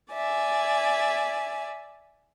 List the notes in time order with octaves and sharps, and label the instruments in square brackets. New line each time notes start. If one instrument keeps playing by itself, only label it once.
[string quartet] D5 E5 G#5